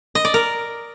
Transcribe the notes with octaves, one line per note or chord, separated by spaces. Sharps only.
D#5
D5
A#4